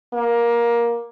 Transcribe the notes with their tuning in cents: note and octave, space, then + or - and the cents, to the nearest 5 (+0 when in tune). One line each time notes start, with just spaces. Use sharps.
A#3 +15